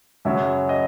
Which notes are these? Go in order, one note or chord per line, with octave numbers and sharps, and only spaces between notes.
F#2 C#3 F#3 E5
D#5